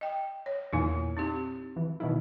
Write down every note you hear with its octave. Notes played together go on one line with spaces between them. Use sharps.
D#5 G5
C#5
E2 A#2 D#4 E4 G#5
C4 D#4 G4
E3
B2 D#3 E4